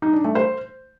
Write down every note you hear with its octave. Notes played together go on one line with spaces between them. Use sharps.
D#4
D4
A3
C5